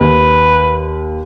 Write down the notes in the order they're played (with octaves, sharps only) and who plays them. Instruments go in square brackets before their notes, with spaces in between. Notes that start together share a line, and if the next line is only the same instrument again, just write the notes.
[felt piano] D#2 [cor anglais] B4